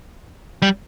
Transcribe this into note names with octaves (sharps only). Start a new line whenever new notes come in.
G3